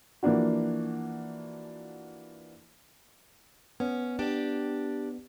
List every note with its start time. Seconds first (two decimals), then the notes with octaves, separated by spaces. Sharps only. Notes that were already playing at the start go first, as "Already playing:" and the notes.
0.23 E3 F3 A#3 D4 F#4
3.80 B3 C#4
4.19 D4 G4